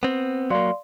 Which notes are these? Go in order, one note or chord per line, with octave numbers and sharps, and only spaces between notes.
B3 C4
F#3 A#3 D5 F5 C6